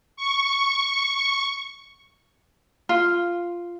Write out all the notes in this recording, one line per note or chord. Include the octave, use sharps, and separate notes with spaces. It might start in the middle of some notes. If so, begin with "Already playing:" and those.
C#6
F4